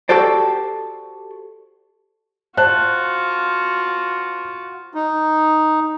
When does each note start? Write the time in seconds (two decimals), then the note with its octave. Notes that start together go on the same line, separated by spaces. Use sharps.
0.09 F#4 G4 A4 C5 D5
2.57 F4 F#4 C5 A5 F#6
4.94 D#4